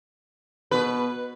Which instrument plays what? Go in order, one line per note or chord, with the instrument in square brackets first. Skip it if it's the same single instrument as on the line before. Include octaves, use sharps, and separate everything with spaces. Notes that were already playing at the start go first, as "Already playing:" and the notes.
[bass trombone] B2 [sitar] B4